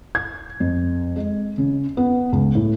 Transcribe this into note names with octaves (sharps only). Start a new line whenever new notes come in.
G#6
F2
G#3
C#3
B3
C#2
A2